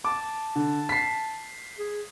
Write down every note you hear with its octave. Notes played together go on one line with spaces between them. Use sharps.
A5 D6
D3
B6 C7
G#4